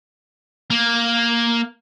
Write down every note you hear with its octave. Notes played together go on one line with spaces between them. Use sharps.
A#3